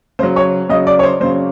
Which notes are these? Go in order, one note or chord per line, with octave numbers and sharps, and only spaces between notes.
C#3 F#3 C5
C#5
C#3 F#3 D#5
D5
C#5
C5
C#3 F#3 C5